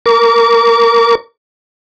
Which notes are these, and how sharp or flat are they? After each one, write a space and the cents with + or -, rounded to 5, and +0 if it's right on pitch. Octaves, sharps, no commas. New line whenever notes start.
A#4 -5 D6 -35